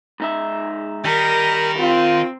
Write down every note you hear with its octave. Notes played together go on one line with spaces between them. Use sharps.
G#2 D#4 E5
D#3 G3 A#4
C4 F4